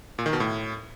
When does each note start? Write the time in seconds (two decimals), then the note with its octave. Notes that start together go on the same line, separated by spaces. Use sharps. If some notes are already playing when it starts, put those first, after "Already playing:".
0.19 A#2
0.26 D#3
0.33 B2
0.40 A2